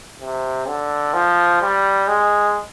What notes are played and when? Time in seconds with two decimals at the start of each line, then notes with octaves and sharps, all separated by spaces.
0.20 C3
0.68 D3
1.14 F3
1.62 G3
2.08 G#3